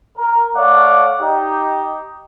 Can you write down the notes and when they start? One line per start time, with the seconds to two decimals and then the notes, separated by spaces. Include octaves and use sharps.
0.17 A#4
0.55 A3 C#5 D5 F5 F#5 D6
1.20 D#4 G4